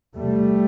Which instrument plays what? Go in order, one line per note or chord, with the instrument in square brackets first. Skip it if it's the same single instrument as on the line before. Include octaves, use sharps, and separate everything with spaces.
[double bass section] E2 C3 G3 A3